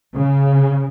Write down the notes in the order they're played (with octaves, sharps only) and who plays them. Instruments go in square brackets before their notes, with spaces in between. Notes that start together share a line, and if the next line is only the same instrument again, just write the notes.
[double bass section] C#3